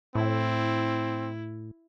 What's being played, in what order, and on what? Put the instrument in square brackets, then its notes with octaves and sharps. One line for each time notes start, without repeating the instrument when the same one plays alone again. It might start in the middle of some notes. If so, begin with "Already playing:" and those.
[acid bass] A2 [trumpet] C4 [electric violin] E4